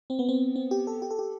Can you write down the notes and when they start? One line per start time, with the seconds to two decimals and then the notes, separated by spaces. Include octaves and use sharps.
0.10 C4
0.19 B3
0.29 C4
0.56 C4
0.71 G4
0.87 A4
1.02 G4
1.11 A4
1.19 G4